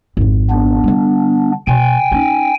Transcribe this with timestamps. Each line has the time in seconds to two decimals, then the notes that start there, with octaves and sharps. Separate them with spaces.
0.17 G#1 F2
0.50 B3 D4
0.84 D3 G3
1.67 B2 G5 G#5
2.12 C#4 D#4